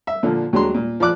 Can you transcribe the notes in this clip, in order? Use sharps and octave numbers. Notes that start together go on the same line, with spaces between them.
E5
A#2 D3 F3
D#2 F#3 G#3 D4 A#5 C6
A#2
F3 D5 D6 F#6